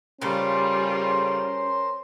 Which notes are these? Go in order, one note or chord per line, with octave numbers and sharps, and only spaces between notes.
C#3 G3 A3 C#4 F4 A#4 C5 C6